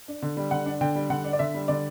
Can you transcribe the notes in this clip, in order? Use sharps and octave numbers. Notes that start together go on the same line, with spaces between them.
D4
D3
G3
D3 F#5
D4
D3 G5
G3
D3 F#5
D4
D5
D3 E5
G3
D3 D5